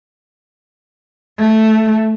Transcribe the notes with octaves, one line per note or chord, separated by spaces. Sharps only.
A3